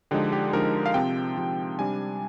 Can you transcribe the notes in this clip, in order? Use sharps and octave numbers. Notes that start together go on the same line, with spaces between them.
D3 F3 G#3 D#4 G4
G4
D3 F3 G#3 D#4 A#4
F5
C3 F3 C4 G5
C3 F3 C4
C3 G3 D4 G#5